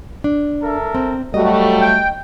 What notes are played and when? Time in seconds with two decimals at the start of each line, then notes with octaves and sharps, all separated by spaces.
0.24 D4
0.62 A4 A#4 E5
0.95 C4
1.34 F#3 G3 A3 F#4 D#5
1.81 G5